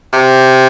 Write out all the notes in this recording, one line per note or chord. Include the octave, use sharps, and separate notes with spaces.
C3